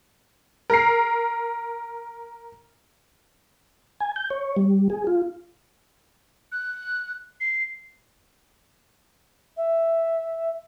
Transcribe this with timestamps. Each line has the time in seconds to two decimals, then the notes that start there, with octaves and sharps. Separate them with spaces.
0.70 A#4 C7
4.00 G#5
4.16 G6
4.30 C#5
4.57 G3
4.90 G#4
5.07 F4
6.52 F#6
7.40 C7
9.57 E5